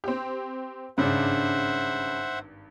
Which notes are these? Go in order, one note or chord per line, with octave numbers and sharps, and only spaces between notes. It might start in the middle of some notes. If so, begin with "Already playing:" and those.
C4 G4
G#1 G2 C#3 D4 C5 E5 F#5